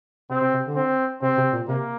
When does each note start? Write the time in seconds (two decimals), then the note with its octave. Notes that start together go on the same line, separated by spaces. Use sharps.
0.30 C3 C4
0.41 C3
0.54 C3
0.65 D3
0.75 C4
1.22 C3 C4
1.38 C3
1.53 A#2
1.68 C3 A#3